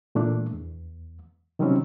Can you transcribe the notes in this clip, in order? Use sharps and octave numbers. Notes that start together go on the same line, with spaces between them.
A#2 E3 A3 A#3 D4
E2
C3 D#3 F#3 G3 C4 C#4